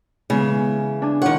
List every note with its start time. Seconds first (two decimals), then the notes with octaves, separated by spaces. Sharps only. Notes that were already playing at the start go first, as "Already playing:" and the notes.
0.30 C#3 E3 G#3 B3
1.02 D4 G#5
1.22 D#3 F4 C#5 F#5